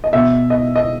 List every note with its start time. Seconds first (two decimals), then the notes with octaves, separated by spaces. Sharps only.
0.04 D#5
0.13 B2 E5
0.50 D#5
0.76 D#5